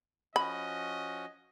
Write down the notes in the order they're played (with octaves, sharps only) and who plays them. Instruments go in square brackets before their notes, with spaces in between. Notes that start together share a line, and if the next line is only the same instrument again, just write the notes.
[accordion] F3 C#4 F#4 [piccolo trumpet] D#5 [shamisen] B5